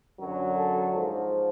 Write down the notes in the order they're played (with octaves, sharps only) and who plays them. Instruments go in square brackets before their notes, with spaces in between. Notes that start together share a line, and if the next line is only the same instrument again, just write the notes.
[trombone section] F#2 D3 F#3
A4
G#2 F3